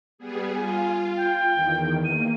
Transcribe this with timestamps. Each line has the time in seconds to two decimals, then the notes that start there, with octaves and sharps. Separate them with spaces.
0.18 G3 B3 G#4
0.55 F4 G#5
1.17 G5
1.53 E2 D#3
2.05 A#3 D#7